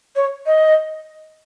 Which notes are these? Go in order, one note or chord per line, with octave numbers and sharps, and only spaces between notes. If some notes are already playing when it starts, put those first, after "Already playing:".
C#5
D#5